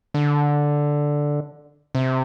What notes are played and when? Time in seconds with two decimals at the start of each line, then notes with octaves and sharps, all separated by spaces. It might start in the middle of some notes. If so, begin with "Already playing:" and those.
0.14 D3
1.95 C3